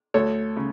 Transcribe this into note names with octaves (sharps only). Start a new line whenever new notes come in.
D2 A4 C#5
C#3